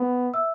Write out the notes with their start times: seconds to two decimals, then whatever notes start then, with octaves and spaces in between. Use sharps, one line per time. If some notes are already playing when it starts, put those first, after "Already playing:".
Already playing: B3
0.34 E5 E6